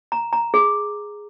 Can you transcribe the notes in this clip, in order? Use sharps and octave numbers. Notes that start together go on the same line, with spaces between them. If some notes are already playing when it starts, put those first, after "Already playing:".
A#5
A#5
G#4